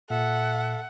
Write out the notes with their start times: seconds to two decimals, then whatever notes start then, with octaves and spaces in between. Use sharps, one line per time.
0.10 A#2 A4 E5 F#5